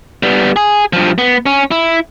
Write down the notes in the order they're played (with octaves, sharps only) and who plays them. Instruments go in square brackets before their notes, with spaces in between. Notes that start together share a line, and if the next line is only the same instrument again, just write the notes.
[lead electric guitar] G3 B3
G#4
G2 F3
B3
C#4
E4